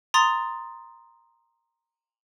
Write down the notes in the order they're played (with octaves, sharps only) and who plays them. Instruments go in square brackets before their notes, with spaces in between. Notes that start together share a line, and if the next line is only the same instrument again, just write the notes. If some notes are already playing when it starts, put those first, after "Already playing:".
[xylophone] A#5 C6 D#6 A6